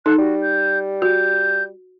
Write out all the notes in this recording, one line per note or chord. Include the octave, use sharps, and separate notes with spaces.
D#4 A4 F#6
G3 F#4
G6
F#4 G6